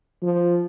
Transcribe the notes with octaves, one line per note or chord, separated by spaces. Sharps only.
F3